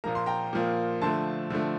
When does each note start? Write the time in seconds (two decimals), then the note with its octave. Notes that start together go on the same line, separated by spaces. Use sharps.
0.04 A#2 F3 A#3 A#5
0.15 C6
0.26 G5 A#5
0.53 A#2 F3 A#3
1.01 D3 F3 A3 A5 C6
1.50 D3 F3 A3